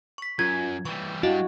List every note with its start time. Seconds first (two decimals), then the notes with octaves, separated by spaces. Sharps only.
0.18 C#6 B6
0.39 F#2 F4 G#6
0.85 E3 G3 C#6
1.23 G3 D4 E4 F#4 D#5 F5